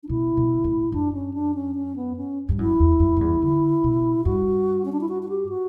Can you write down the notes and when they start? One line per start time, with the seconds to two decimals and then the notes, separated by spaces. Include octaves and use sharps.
0.03 D4
0.09 B2 E4
0.37 B2
0.64 A2
0.92 F#2 D4
1.13 C#4
1.34 D4
1.55 C#4
1.75 C#4
1.96 B3
2.16 C#4
2.49 G2
2.59 F#2 E4
2.79 E2
3.00 F#2
3.17 F#2
3.21 E2
3.42 D3
3.84 B2
4.25 G2 F#4
4.85 C#4
4.92 D4
5.01 E4
5.09 F#4
5.23 F#4
5.29 G4
5.49 F#4